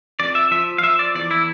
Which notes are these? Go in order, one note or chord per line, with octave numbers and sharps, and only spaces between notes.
F2 D5
E5
F3 E5
F5
F3 E5
D5
E2 D5
E4